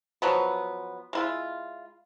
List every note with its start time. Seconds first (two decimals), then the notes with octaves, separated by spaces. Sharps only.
0.22 F3 F#3 B3
1.13 G#3 E4 F4